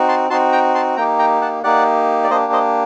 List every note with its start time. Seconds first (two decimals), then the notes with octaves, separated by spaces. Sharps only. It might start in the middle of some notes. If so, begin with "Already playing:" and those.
Already playing: C4 D#4 F#4
0.09 A5 C6
0.30 C4 D#4 F#4 A5 C6
0.52 G5 A#5
0.75 A5 C6
0.97 A#3 D#4 G4 G5 A#5
1.19 G5 A#5
1.41 F#5 A5
1.63 A#3 D#4 G4 D5 F#5
2.24 D5
2.30 A#3 D4 G4 C5 D#5
2.53 C5 D#5